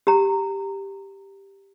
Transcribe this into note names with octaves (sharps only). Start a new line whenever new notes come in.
G4 A#5